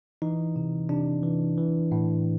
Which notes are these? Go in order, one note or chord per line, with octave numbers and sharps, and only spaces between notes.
E3 D#4
C3
C3 D4
E3
E3
A2